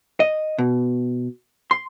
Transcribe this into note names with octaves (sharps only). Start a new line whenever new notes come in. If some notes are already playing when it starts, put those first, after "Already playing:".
D#5
B2
C6